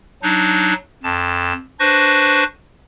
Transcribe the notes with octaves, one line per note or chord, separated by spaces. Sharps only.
F#3 D4 D#4
F2 A5
D4 B4 C5 C#6 A#6